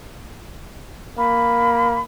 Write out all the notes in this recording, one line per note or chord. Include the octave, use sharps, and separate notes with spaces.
A#3 B5